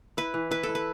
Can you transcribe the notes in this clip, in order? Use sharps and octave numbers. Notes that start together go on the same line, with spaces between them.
E4 B4
E3
E4 B4
A4
E4
B4